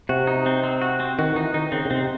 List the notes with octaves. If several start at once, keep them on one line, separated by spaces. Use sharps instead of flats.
C3 F#4
D#4
C4
C4
F#4
C4
D#3 F#4
E3 D#4
D#3 D#4
C#3 C4
C#3
C3 C4